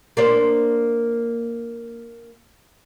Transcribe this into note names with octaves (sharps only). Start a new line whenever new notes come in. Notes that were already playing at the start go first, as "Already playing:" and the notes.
A#3 D4 C5